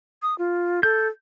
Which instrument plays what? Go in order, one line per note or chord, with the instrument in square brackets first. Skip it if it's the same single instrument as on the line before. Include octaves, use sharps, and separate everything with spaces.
[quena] D#6
F4
[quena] A4 [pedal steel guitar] G6